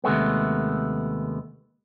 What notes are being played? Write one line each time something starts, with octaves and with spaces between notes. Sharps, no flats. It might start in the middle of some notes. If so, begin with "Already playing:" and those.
D#2 C3 G#3 A3 B3